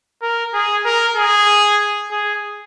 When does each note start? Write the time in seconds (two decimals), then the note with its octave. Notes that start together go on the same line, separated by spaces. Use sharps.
0.22 A#4
0.54 G#4
0.85 A#4
1.17 G#4
2.11 G#4